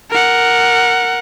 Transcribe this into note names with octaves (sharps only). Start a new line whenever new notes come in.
A#4 F#5